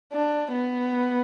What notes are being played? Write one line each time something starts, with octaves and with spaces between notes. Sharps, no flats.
D4
B3